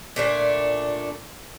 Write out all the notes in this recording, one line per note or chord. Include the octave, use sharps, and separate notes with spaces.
A#2 A3 D4